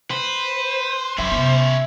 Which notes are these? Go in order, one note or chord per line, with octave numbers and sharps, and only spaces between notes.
B4 C5
F#1 F#2 C#4 E4 E5 G5 D6
C3 B3